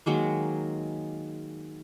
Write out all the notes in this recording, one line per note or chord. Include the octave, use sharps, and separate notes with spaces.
D#3 F#3 G#3 A#3